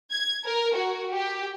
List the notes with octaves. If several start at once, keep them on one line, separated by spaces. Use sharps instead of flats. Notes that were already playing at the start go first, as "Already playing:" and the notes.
G#6
A#4
F#4
G4